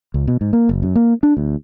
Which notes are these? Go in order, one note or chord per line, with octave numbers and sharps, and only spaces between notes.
C#2
B2
G#2
A#3
F#1
F#2
A#3
D4
D2